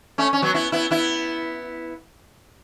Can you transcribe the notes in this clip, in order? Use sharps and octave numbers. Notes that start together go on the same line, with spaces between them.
A3 C#4
C#4
F#3 B3
B3 E4
B3 E4
B3 E4